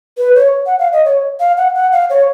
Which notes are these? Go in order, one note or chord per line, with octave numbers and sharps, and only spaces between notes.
B4
C#5
F#5
F5
D#5
C#5
F5
F#5
F#5
F5
C#5